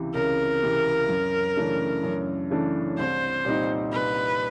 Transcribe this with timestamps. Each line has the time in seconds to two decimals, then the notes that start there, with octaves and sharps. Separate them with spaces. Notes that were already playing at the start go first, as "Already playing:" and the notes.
Already playing: C#2 C3 E3
0.14 C#2 A#4
0.62 C3 E3
1.09 F#2
1.57 C#3 E3 A3 D4
2.03 F#2
2.50 C#3 E3 A3 D4
2.98 C2 C5
3.45 A#2 G3 C4 D#4
3.92 C2 B4